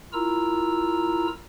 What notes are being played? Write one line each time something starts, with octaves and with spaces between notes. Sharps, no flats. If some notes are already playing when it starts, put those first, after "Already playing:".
E4 F4 A#4 A#5 E6